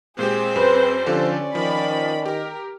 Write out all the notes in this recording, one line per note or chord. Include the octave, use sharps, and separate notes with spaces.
A#2 G#3 C4 G4 G#4 C5
F#2 B4
D3 F3 C#4 G4 A4 D5
D#3 F3 B5
G4 A#4